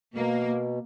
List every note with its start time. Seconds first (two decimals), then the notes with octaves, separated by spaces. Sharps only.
0.14 B2 A#3